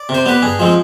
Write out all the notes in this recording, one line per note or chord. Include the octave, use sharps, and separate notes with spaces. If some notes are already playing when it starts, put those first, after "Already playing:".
Already playing: D5
C3
C5
G3 B3 B4
G2 G#4
F3 G#3 C4